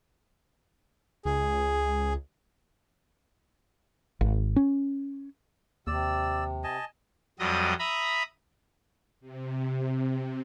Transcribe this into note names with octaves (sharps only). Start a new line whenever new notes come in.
C#2 G#4
G#1
C#4
D#2 C3 D5 E6
D#5 G#5 A5
F2 F#3 G3 D#5 D#6
E5 A#5 B5 D#6
C3